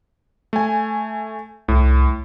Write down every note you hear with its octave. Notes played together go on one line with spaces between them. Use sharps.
A3 G#5
C2 A2